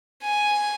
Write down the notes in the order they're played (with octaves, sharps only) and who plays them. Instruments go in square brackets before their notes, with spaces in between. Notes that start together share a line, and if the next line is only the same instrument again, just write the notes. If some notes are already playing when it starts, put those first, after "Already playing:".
[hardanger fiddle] G#5